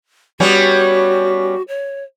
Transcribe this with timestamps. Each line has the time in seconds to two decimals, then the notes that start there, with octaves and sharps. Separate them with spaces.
0.40 G3 B3 C#4 F#4
1.68 C#5